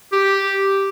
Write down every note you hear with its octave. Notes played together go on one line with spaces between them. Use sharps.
G4